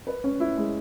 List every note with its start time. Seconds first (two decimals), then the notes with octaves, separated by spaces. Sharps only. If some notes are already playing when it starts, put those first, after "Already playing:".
0.07 B4
0.24 C#4
0.40 E4
0.57 G#3